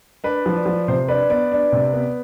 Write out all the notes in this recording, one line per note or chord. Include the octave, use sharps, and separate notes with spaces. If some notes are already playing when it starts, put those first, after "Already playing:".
D4 B4 D5
F3
F3
C3 C5
D4 B4 D5
B3 B4 D5
D4
C3
B3